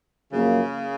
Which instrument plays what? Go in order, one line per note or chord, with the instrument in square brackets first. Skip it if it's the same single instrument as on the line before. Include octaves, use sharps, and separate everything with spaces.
[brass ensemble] F#2 F3 A#3 [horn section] C#3